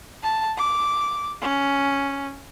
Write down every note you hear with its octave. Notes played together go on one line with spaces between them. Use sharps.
A5
D6
C#4